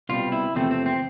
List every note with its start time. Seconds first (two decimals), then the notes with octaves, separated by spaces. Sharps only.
0.09 C2 B2 G3 F4
0.32 E4
0.55 E2 C3 F3 A3 C4
0.71 C4
0.86 C4